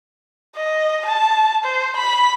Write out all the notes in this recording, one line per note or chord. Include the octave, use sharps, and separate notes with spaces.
D#5
A5
C5
B5